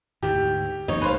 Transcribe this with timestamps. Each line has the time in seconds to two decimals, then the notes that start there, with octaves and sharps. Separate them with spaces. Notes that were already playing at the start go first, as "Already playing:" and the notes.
0.23 D2 G#2 G4
0.88 F#2 E3 B3 D#4 C#5
1.02 C2 A3 B4 C5 F5